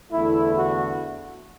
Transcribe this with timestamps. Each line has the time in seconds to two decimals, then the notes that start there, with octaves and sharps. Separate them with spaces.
0.11 E2 D3 A3 E4
0.57 F#4